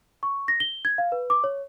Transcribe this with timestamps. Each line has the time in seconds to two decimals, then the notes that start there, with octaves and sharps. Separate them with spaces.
0.23 C#6
0.48 A#6
0.60 G7
0.85 G#6
0.98 F5
1.12 B4
1.30 D6
1.44 C#5